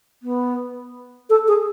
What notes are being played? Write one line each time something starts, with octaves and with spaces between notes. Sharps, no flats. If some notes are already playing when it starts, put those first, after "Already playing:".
B3
A4
G#4